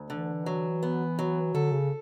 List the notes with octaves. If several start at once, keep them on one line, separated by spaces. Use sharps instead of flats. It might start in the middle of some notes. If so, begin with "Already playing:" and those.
Already playing: D2
D3 E3
F#3
B3
F#3
D3 A4
C#3